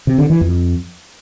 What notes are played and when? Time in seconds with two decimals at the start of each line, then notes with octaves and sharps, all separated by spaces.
0.07 C3
0.18 D3
0.30 E3
0.41 F2